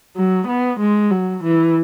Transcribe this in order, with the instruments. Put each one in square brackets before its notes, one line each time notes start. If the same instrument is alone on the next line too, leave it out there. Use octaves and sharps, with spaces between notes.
[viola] F#3
B3
G#3
F#3
E3